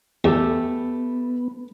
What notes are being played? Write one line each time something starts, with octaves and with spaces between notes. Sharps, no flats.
E2 A3 B3 G4 A4